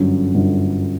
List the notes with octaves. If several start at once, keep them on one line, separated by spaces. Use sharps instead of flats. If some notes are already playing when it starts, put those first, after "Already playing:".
Already playing: G1 F#2 D3
G1 F#2 D3